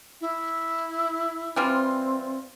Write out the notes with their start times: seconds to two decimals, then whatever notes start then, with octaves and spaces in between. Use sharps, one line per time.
0.21 E4
1.56 E3 G3 C4 F4